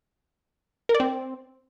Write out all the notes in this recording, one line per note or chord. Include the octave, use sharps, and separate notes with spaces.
A#4
D5
C4